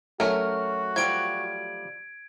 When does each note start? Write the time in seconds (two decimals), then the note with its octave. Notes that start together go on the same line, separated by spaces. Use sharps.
0.20 F#3 A3 C#4 F#4 A#4
0.96 F3 G3 G#6 D7